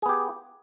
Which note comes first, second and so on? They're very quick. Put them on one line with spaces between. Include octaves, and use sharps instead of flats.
G#4 B3 G4